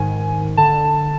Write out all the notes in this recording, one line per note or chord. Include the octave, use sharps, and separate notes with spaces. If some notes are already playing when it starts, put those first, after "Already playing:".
Already playing: G#2 D#3 G#5
D3 A5